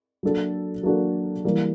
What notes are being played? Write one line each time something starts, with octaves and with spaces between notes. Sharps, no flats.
F#3 A#3 D4 F#4 A4
F#3 A#3 D4 F#4 A4
E3 G3 A#3